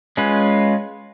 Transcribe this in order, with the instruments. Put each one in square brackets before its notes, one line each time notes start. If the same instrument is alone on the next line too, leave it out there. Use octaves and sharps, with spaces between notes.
[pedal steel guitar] G#3 C#4 F4 B4